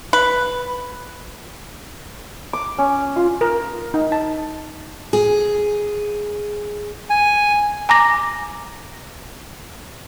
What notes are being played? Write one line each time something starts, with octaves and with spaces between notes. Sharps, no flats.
B4
D6
C#4
F4
A#4
D#4
A5
G#4
G#5
G#5 A#5 D6 A#6